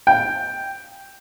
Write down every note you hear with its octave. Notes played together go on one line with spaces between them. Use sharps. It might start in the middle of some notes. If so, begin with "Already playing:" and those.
G5